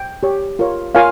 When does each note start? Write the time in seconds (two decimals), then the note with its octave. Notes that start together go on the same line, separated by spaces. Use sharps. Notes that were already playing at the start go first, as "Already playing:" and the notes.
Already playing: G5
0.23 G4 C#5
0.59 F4 A#4 C#5
0.95 F4 A#4 C#5 F5 G#5